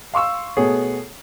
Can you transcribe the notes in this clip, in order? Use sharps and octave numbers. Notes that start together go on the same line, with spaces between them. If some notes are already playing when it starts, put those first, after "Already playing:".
F5 C6 C#6 E6
B2 A3 B3 G#4 C#5